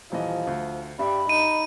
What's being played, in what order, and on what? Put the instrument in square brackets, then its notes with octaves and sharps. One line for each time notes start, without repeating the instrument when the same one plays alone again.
[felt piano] D#1 E3 D#5 [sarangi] F3
[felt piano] D2
[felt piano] G2 E5 [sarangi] G3 [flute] B5
[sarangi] D#4 [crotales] D#7